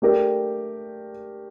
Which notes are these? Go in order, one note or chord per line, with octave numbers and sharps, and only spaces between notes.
A3 D4 G4 A#4